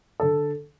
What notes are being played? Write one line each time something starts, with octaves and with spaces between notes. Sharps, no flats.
D3 A4